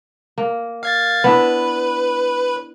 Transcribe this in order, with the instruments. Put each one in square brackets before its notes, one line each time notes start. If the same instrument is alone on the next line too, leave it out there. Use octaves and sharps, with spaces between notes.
[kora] A#3
[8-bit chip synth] F5 G#6 A6
[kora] B3 D4 E4 [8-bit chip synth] B4